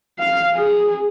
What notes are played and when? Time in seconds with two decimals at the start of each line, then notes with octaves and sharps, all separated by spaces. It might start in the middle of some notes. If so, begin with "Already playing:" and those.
0.19 F5
0.54 G#4